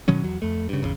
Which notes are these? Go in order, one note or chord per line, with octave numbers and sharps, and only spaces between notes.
B2 D#3 F#3 C#4
E2 F#3
F2 A3
G2 C#3
G#1 E2 C#3